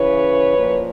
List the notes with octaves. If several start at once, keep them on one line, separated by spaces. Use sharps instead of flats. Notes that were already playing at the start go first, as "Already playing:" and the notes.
Already playing: C#3 E3 B4 C#5
A#2 F3